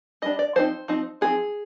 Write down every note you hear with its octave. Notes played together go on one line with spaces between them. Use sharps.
G3 D4 D#5
D5
F3 C4 D#4 C5
F3 C4 D#4
F3 C4 D#4 G#4